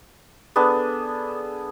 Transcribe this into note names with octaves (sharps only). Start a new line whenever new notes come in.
B3 D4 G#4 A4